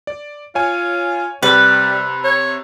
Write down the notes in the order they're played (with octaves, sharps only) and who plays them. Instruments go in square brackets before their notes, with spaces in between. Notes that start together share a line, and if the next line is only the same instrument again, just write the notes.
[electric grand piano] D5
[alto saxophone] F4 [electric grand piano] C#5 G#5
[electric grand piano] C3 [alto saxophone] G3 [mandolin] B4
[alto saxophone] C#5